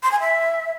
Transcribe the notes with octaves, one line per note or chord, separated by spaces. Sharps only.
C6
G#5
E5